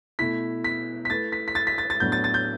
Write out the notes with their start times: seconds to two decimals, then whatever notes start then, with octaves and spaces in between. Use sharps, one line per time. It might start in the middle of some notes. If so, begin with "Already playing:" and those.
0.19 B2 A3 E4 B6
0.64 B6
1.05 B6
1.10 A3 E4 B4 A6
1.32 B6
1.48 B6
1.55 A6
1.67 B6
1.78 A6
1.90 A6
2.00 A2 F#3 B3 D4 G6
2.12 A6
2.24 A6
2.34 G6